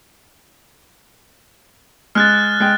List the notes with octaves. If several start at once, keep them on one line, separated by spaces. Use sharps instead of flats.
G#3 F6 F#6 A6
G#3 G5